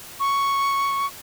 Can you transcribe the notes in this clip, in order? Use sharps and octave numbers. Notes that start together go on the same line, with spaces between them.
C#6